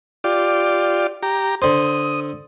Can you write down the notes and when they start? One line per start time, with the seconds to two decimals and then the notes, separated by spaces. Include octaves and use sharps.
0.24 F4 G4 D5
1.23 G4 A#5
1.62 D3 C5 D#6